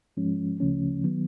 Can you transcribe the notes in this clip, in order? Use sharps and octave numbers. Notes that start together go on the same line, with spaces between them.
G#2 F3 G#3 C#4
D2 C#3 F3 A3 C#4
D#3 F#3 B3